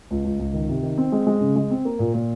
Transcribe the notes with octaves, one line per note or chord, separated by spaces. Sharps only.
C#2
C#2
C#2
D#3
C3
D#3
C4
G#3
G#3
C#3
G#3
C4
A#3
A#2
A#2